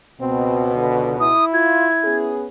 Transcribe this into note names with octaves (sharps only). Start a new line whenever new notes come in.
C#2 B2 C4
D3
E4 D#6
F4 G#6
B3 C#4 G#4